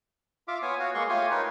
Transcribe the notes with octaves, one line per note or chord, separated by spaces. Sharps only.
F4 E5 F5 D6
B3 C#5 G#5
F#4 C#5 F5
G#3 A#3 G#4 C6 C#6
A3 F4 G4 C#5 F5 G#5
D#4 A#4 B4 C#5